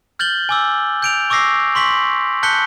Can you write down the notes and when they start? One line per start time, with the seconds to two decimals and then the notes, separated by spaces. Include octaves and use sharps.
0.19 F6 G6 A6 F#7 G7
0.49 G#5 D6 E6
1.02 G6 D7 F7
1.30 C#6 D6 E6 A#6 C7
1.75 C6 C#6 B6 F#7
2.43 A5 F#6 G6 B6 C#7 G7